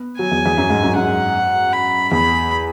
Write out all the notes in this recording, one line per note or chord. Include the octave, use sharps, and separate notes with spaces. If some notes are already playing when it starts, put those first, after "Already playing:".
Already playing: B3
F#3 G#5
E2
E2
F#2
G#2
F#2
F#2 F#5
B5
E2 B5